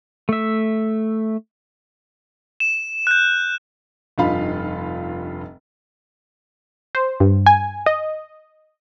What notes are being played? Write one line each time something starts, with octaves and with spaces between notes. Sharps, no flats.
A3 E5
E7
F#6 G6
F1 G2 D#4 F4 F5 B5
C5
G2
G#5
D#5